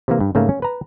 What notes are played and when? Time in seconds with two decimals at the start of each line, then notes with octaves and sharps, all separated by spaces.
0.08 C3 E3 A#3
0.20 G2
0.35 G#2 C#3 A3 A#3
0.49 C#4
0.62 B4 A#5